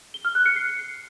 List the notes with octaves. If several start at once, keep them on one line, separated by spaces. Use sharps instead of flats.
G7
F6
F#6
C#7
C7